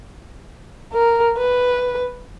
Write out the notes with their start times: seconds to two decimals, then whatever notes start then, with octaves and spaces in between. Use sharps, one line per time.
0.93 A#4
1.37 B4